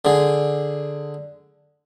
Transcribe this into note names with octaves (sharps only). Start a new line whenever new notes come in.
D3 G#4